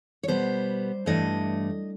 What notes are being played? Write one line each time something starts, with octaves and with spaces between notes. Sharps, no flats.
C#5
B2 G3 B3 C5
G2 E3 A3 D4 D#5